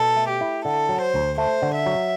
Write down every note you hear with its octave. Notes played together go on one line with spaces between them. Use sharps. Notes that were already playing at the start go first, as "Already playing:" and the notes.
Already playing: B2 A4
A3
G4
E4
D3 A4
F#3
C5
D2
A3 C5
D3
E5
F#3